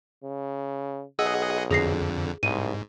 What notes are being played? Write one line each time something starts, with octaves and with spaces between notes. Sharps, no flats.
C#3
B1 G#4 D#5 F#5 E6
F2 D3 G#4 A#6 C7
C2 G#2 D#7